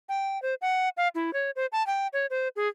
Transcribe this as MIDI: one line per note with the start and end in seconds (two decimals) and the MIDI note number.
0.09 0.40 79
0.42 0.54 72
0.62 0.89 78
0.97 1.08 77
1.15 1.33 64
1.33 1.51 73
1.56 1.66 72
1.72 1.85 81
1.87 2.07 79
2.13 2.26 73
2.30 2.48 72
2.56 2.68 68